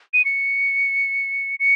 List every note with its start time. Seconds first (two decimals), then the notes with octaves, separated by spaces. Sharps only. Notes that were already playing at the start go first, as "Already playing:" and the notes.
0.13 D#7
0.25 C#7
1.60 C#7